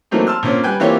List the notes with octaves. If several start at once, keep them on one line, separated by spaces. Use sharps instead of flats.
E3 F#3 A3 A#3 C4 D#4
A5 C6 E6 F6
A#2 D3 C4 C#4
G3 B4 G5 G#5
E3 A#3 C4 F4 G4 C#5